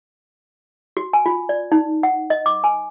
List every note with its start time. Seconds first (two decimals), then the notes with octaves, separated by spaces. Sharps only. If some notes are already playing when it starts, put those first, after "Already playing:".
0.97 F#4
1.13 G#5
1.26 F4
1.49 D5
1.72 D#4
2.03 F#5
2.30 D#5
2.46 D6
2.64 G#5